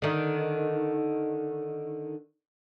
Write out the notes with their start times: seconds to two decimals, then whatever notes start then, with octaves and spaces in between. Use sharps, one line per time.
0.02 D3 D#3